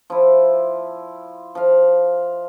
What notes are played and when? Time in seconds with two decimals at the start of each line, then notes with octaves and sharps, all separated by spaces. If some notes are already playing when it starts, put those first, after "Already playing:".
0.10 F3 E4
1.55 F3 F5